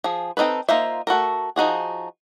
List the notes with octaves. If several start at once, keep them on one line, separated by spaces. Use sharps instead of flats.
F3 G#4
C4 D4 D#4 A4 B4
A#3 D#4 F4 C5 E5
A3 F#4 A4 A#4
F3 D#4 F#4 G#4